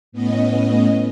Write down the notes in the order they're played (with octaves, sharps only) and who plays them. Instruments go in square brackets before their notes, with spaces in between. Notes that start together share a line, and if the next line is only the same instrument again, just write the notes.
[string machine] A2 B3 C#4 D#5